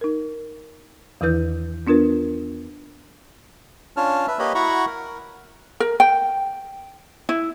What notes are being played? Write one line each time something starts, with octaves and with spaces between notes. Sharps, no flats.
D#4 A#4
E2 D#3 E3 E4 B4 G6
B3 D4 F4 A#4 B4
C#4 D4 F4 C#5 A5 F6
B4 E5
A#3 G4 B4 C#5 D#5 B5
E4 F#4 F#5 A#5 B5 C#6
A#4
A#4
G5
E4